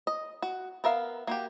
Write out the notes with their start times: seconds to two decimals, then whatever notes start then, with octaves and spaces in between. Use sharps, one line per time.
0.07 D#5
0.42 F#4
0.84 B3 A#4 E5 F5
1.27 A#3 F#4 G4